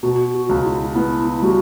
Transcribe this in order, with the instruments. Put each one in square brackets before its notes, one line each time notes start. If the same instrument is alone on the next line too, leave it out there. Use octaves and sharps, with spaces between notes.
[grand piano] B2 [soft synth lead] F#4
[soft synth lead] F#4
[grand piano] C#2
[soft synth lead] E4
[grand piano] B3 [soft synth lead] E4
[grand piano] G3 [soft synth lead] F#4